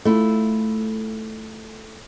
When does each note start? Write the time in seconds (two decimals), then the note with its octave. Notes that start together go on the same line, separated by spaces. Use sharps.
0.05 A3 E4 F4